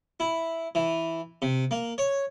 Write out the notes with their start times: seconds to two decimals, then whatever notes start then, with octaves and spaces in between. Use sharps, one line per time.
0.20 E4
0.75 E3
1.42 C3
1.71 A#3
1.98 C#5